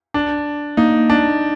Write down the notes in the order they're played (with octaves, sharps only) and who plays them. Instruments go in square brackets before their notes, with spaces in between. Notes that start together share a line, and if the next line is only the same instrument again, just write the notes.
[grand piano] D4
[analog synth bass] A#3 [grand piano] D#4
[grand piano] D4